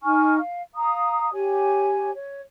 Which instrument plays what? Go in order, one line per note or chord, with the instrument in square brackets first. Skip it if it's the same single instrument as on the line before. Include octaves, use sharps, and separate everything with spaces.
[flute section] D#4 G#5 C#6 F6
F5
F5 A#5 D#6
G4 C#5 G#5
C#5